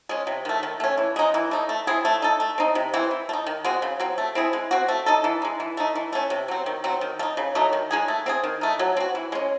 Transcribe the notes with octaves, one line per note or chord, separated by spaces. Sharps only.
G#3 C#4
C3
D#3 A3
D#3
A3 C#4
E3
G#3 D#4
E3
A3 D#4
A3
C4 E4 G#4
A3
D#4 A4
A3
C4 D#4
C3
E3 C4
E3
A3
D#4
D#3
G#3 C4 F#4
C#3
F#3 C4
A3
C4 E4 G#4
G#3
C4 F#4
A3
D#4 A4
E3
G#3 D#4
E3
A3 D#4
E3
A3 C#4
C3
F#3 C4
D#3
F#3 C4
D#3
A3
D#4
C#3
F#3 A3 D#4
D#3
G#3 D#4 G#4
A3
C4 E4 G#4
D#3
A3 D#4
F#3
C4 F#4
E3
G#3 C#4